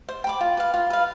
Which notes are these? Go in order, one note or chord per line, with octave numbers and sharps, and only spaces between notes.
C5
G5 B5 D6
F4
B4 F5
F4
B4 F5